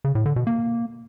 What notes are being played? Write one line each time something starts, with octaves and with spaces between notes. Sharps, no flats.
C#3
A2
D3
B2
A#3